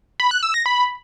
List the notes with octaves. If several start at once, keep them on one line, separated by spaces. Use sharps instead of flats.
B5
F#6
E6
A#6
B5